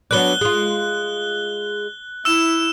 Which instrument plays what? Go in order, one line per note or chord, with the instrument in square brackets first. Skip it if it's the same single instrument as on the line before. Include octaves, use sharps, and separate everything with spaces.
[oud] F#3 B3 D4 [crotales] F#6 G7
[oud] G#3 F4
[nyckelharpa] E4 [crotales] E6 E7